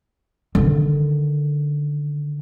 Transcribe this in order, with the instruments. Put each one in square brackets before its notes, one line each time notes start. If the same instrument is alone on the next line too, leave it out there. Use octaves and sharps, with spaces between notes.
[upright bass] D3 D#3